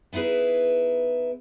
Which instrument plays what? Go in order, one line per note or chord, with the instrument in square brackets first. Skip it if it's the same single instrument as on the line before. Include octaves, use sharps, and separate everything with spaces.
[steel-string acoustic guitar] B3 D#4 E4 G#4 B4